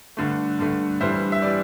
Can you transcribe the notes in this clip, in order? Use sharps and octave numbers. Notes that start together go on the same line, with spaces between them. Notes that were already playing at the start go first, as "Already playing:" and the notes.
G2 D3 A3
G2 D3 A3
G2 E3 G3 C5 E5
E5
E3 G3 D5